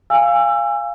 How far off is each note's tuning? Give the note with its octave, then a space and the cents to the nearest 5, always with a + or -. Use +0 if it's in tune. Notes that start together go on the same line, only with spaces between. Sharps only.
F5 -5 G#5 -25 E6 +25